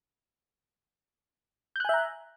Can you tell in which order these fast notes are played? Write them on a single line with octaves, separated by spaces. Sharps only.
G6 F#6 G#5 E5 A#5